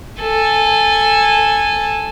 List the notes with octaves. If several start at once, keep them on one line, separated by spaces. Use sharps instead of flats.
A4 G#5